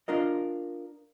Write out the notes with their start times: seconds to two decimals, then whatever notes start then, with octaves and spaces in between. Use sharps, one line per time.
0.08 D4 F4 A#4 D#5